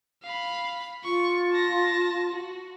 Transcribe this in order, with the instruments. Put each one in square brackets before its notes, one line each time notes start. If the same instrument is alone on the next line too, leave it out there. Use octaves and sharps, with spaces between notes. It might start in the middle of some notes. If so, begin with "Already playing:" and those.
[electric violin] F5 B5
[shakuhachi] F4 [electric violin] C#6
[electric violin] A5 A#6
F#4